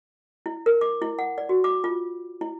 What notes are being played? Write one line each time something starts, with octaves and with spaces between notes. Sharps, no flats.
E4
A#4
D6
E4
F#5
D5
F#4
D6
F4
E4